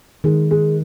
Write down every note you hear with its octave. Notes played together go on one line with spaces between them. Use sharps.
D#3 G#3
G#3